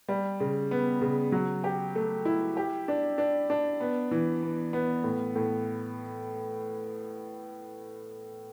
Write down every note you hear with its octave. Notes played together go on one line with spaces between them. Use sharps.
G3
C#3
B3
C#3
F#3
G4
A3
E4
G4
D4
D4
D4
B3
E3
B3
B3
A2
A2